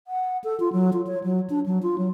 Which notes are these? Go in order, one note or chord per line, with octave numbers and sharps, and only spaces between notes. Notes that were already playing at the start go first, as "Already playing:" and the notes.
F#5
A4
F4
F#3
F4
C#5
F#3
D4
F#3
F4
F#3